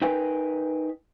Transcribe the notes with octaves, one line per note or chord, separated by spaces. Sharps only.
D#4 A#4 B4 G5 G#5